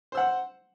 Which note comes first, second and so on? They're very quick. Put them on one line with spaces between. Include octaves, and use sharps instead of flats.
C5 E6 F#5